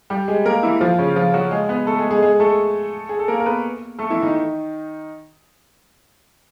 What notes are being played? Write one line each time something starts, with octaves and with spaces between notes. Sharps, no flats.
G3 G4
G#3 G#4
A#3 A#4
E3 E4
F3 F4
C#3 C#4
F3 F4
F#3 F#4
G#3 G#4
B3 B4
A3 A4
G#3 G#4
G#3 G#4
G#3 G#4
A3 A4
G#4
A4
A#3 A#4
A#4
B3 B4
A3 A4
E3 E4
D#3 D#4